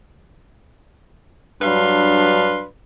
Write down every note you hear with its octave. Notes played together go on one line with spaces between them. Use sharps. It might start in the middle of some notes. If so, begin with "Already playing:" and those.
G2 F#3 D4 B4 F5 C6